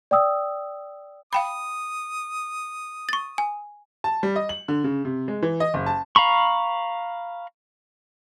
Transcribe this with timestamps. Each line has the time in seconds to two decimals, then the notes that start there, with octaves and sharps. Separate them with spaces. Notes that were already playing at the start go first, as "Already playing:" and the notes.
0.11 D5 G5 D#6 E6
1.33 F5 G5 B5 D#6
3.09 C#6 A6
3.38 G#5
4.04 A5
4.23 G3
4.36 D#5
4.49 F#7
4.68 D3
4.84 C#3
5.05 C3
5.28 G#3
5.43 E3
5.60 D#5
5.74 F#1
5.86 A5
6.16 F5 A#5 B5 C#6